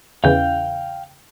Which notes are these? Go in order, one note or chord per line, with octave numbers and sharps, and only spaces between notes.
E2 C#3 E3 F5 G5 G6